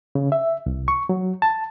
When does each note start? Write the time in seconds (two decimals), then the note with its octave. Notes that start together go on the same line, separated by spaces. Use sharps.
0.15 C#3
0.32 E5
0.66 C2
0.88 C#6
1.09 F#3
1.42 A5